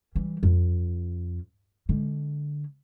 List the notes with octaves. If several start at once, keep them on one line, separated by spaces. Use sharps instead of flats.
E3 G3
F2
D3 G#3